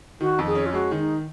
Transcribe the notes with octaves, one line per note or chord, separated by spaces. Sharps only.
D#3 F#4
F2
G#4
C#4
F4
G#3 F#4
D#3
D#4